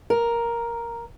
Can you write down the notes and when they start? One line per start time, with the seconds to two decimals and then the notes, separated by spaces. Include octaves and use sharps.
0.10 A#4